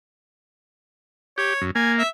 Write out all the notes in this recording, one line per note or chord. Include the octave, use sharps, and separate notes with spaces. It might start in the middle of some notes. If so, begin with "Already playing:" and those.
G4 C#5
F#2
A#3 G#5
E5